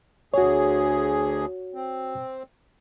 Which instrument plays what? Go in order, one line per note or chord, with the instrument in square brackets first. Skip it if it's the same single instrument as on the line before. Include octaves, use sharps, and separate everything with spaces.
[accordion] D2 G#4 [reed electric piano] F#4 C#5
[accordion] C4